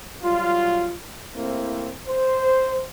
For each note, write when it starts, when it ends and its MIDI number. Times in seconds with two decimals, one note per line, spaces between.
0.23 0.93 54
0.23 0.93 55
0.23 0.93 65
1.34 1.89 45
1.34 1.89 48
1.34 1.89 58
1.34 1.89 60
1.34 1.89 64
2.08 2.88 72